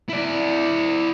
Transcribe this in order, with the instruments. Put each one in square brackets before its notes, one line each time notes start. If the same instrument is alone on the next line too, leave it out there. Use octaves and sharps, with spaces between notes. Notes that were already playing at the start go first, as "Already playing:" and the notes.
[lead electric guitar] E4 D5